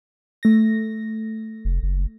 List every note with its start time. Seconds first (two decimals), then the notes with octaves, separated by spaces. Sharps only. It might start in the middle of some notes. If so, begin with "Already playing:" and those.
0.43 A3 A#6
1.65 F1
1.83 F#1